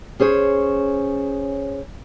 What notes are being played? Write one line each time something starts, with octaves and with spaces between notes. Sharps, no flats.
C#4 G#4 C5 C#5